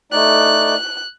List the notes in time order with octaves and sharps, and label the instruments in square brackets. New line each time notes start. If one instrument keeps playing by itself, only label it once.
[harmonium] A3 D#4 D5 [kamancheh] F#6